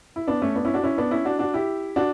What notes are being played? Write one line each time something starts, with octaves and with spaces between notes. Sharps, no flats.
E4
B3 D4
A3 C#4
B3 D4
C#4 E4
D4 F#4
C#4 E4
B3 D4
C#4 E4
D4 F#4
D4 F#4
E4 G4
D4 F#4